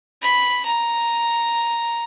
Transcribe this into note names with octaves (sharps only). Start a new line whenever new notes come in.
B5
A#5